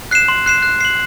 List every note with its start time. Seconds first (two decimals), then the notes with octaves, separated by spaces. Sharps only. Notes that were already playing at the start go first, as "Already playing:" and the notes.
0.11 F#6 C7 E7
0.28 C6
0.46 F#6 C7 E7
0.63 F#6
0.81 C7 F#7